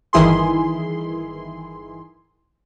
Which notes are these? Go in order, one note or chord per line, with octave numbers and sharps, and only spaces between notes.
G1 D#3 E3 E4 G#4 C6